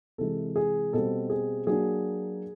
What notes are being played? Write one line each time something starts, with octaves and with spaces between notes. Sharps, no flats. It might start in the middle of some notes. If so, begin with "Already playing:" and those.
C3 E3 G#3 A4
G#4
B2 G3 C4 A4
G#4
F#3 A#3 D4 G#4